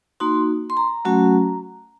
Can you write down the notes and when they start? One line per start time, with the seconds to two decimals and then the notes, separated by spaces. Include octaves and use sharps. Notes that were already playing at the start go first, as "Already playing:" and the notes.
0.20 A#3 D#4 F#4 C6
0.70 C6
0.77 A#5
1.05 F#3 A3 C#4 F#4